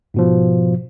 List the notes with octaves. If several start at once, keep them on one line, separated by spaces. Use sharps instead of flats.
G#2 B2 F3